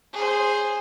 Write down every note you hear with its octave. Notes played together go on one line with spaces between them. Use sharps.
G#4 C5